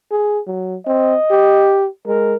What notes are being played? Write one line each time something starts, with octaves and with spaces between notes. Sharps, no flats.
G#4
F#3
C4 D#5
G4
G#3 A#4